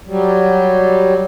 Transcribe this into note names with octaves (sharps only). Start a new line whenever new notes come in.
F#3 G3